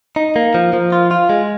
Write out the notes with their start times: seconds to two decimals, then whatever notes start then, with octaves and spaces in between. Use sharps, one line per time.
0.16 D#4
0.36 A#3
0.54 F3
0.73 F3
0.92 F4
1.11 F4
1.29 G#3